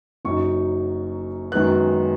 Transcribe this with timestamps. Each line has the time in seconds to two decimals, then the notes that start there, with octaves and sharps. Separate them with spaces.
0.25 F#1 F#2 F#3 D#4 C#6
1.52 F#2 D#3 G#3 B3 F#6